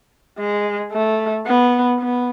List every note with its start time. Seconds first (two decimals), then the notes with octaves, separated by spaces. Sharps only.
0.38 G#3
0.92 A3
1.46 B3
1.99 B3